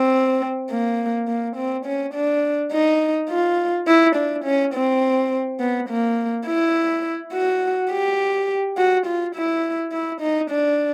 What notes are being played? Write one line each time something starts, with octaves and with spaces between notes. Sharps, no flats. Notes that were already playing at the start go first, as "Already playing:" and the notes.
Already playing: C4
A#3
A#3
C4
C#4
D4
D#4
F4
E4
D4
C#4
C4
B3
A#3
E4
F#4
G4
F#4
F4
E4
E4
D#4
D4